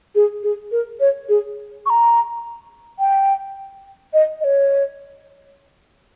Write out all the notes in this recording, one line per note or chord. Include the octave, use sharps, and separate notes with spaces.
G#4
G#4
A#4
C#5
G#4
C#6
A#5
G5
D#5
D#5
C#5